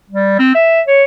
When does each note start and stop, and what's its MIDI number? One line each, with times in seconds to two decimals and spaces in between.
0.10 0.35 55
0.39 0.54 60
0.55 0.81 76
0.87 1.04 73